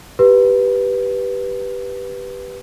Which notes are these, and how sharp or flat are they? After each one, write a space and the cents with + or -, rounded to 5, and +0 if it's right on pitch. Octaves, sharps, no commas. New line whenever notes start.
G4 +0 B4 -5